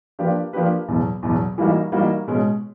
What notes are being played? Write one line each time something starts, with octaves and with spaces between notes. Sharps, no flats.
F3 A#3 D4 G4 B4
F3 A#3 D4 G4 B4
E2 B2 F#3
E2 B2 F#3
E3 G3 A#3 D#4 F#4
E3 G3 A#3 D#4 F#4
B2 G#3 C#4